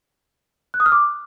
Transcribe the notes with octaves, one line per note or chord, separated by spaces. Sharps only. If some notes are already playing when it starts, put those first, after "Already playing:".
F#6
D#6
F6
D6